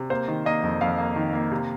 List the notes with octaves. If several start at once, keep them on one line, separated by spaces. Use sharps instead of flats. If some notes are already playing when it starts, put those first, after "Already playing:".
Already playing: C3
A#3 C5
D#3
A#3 D#5
F2
F2 F5
A#3
D#3
A#3
C3